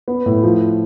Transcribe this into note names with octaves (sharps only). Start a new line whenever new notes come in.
B3
A2
F3